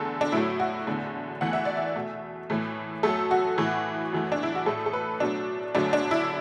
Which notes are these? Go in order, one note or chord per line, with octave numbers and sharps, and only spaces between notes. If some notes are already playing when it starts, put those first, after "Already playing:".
Already playing: E2 D3 A3 A4
D4
A2 F#3 A3 E4
F#4
E2 D3 A3
E2 E3 A3 F#5
E5
D5
E5
B2 A3
A2 E3 A3
F#2 F#3 A3 A4
F#4
A2 E3 A3
F#2 E3 A3
D4
E4
F#4
A2 A3 A4
A4
B4
B2 F#3 A3 D4
F#2 D3 F#3 A3 D4
D4
E4